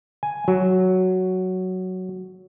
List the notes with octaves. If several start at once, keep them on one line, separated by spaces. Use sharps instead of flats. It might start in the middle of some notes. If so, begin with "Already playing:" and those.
G#5
F#3